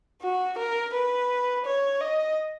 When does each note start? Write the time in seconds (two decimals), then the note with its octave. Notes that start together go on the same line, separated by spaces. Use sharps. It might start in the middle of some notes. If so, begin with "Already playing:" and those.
0.23 F#4
0.58 A#4
0.94 B4
1.66 C#5
2.01 D#5